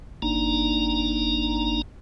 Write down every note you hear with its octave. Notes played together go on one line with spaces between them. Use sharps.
G1 A#3 D4 D#4 A#5